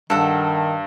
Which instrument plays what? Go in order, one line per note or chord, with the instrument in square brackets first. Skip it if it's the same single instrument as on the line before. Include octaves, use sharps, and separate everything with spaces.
[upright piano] G2 [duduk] D#3 [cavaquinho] A4 F#5